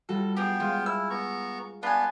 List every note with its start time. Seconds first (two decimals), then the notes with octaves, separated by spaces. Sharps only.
0.09 G3 F4 F#4 A4
0.37 B3 G4 G#4 G5
0.60 G#3 F4 F5
0.86 E4 E6
1.10 B3 A#5 C#6
1.83 B3 D4 F4 B4 G#5